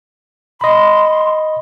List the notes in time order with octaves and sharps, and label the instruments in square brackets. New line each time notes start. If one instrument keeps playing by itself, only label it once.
[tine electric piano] D#5 B5 [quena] C6